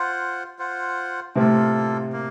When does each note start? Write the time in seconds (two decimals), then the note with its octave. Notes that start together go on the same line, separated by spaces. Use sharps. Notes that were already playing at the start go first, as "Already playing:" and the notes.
Already playing: F4 C5 F#5
0.59 F4 C5 F#5
1.36 A2 C3 A#3 F4 A4
2.12 A#3